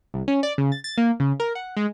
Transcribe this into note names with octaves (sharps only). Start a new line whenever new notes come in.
C2
C#4
D5
C#3
A6
A6
A#3
C#3
A#4
F#5
G#3